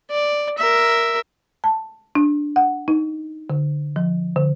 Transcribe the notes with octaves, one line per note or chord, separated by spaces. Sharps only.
D5
A#4 E5
A5
D4
F#5
D#4
D3
F3
D3